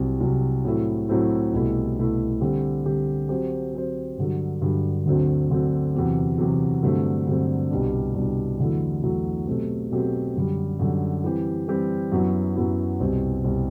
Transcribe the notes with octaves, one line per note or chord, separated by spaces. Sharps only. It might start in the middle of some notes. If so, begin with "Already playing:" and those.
Already playing: C2 C3 F#3
C2 C3 F#3
A2 F#3 A3 C4 E4
A2 F#3 A3 C4 E4
C2 B2 A3 E4
C2 B2 A3 E4
D3 G3 C4 G4
D3 G3 C4 G4
F#3 C4 G4 C5
F#3 C4 G4 C5
G2 D3 F#3
G2 D3 F#3
D2 D3 F#3 C4 F#4
D2 D3 F#3 C4 F#4
E2 C3 F#3
E2 C3 F#3
G2 D3 F#3 A3 C4
G2 D3 F#3 A3 C4
C2 B2 G3 D4
C2 B2 G3 D4
E2 D3 F#3 A3 E4
E2 D3 F#3 A3 E4
B2 F#3 A3 C4 G4
B2 F#3 A3 C4 G4
F#2 D3 G3
F#2 D3 G3
E3 G3 C4 G4
E3 G3 C4 G4
F#2 F#3 B3 E4
F#2 F#3 B3 E4
C2 B2 G3 C4
C2 B2 G3 C4